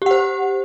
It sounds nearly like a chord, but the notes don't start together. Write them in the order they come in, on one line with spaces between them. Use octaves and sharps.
G4 F#5 C5